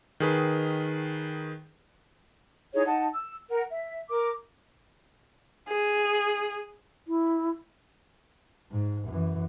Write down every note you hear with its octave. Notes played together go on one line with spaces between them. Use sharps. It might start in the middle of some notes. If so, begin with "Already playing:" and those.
D#3 G#4 B4
D#4 E4 G#4 C#5
D#4 F#5 A5
E6
A#4 F#5
E5
A#4 D6
G#4
E4
G#2
F#2 E3